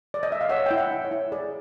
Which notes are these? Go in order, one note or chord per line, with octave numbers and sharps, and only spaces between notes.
D5
D#5
E5
F5
C#5 E5 F#5
E4 G5
E5 F#5
E4
C#5
E4
G#4 D5